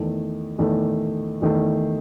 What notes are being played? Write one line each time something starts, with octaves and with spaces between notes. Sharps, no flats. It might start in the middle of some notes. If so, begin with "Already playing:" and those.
Already playing: E2 D#3 A3
E2 D#3 A3
E2 D#3 A3